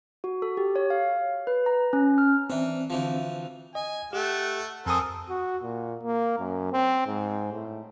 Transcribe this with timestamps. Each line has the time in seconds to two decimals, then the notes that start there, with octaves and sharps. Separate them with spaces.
0.24 F#4
0.42 A4
0.57 G4
0.76 C#5
0.90 F5
1.47 B4
1.66 A#5
1.93 C#4
2.18 F6
2.50 E3 C4 D4
2.90 D2 E3 F3
3.75 D#5 G#5
4.13 A3 G4 F#5
4.86 F2 C4 A4 A#4 G#5 D#6
5.29 F#4
5.63 A#2
6.03 A#3
6.39 F#2
6.72 C4
7.07 G#2
7.52 A2